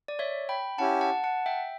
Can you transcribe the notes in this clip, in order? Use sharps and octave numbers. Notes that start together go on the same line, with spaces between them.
D5
C#5 E5
G5 B5
C#4 E4 G4 F#5 A5
F#5 A5
F#5 A5
E5 G5